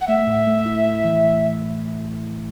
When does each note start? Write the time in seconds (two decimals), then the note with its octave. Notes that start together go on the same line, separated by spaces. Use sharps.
0.01 F#5
0.08 A3 E5
0.26 A2
0.47 A3
0.65 E4
0.86 A3
1.04 E3
1.24 E3